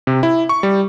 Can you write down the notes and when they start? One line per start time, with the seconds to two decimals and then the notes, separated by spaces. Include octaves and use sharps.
0.07 C3
0.23 E4
0.49 C#6
0.63 G3